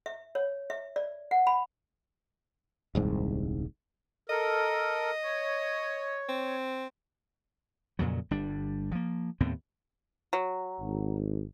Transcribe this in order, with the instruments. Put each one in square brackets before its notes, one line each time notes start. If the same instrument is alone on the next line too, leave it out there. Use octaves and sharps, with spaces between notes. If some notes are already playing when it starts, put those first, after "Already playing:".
[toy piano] E5
C#5
E5
D5
F#5
B5
[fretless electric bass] D#1 C2 G#2
[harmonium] A4 A#4 [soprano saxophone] D#5
[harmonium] C#5
[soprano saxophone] C4
[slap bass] F2 A#2 C#3 F#3
G1 G3 D4
F3 A#3
D#2 A2 B3 C4
[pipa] F#3
[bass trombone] G#1